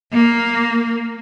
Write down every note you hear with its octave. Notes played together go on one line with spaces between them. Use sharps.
A#3